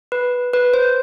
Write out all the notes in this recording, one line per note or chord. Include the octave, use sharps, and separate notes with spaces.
B4
B4
C5